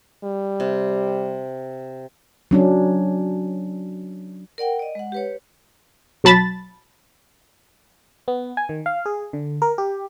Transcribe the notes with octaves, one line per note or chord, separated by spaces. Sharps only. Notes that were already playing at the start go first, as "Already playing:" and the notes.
G3
C3
F#3 C#4 D4
A#4 D5 F#5 G5
D5 D#5
G#3 F#5
G4 B4 C#5
B1 F#3 A5 B5 A6
B3
G#5
D#3
F5
G#4
D3
A#4
G4